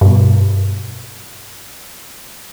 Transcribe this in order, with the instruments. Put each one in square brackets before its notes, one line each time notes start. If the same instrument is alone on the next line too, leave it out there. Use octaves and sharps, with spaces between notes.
[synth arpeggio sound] G2 B2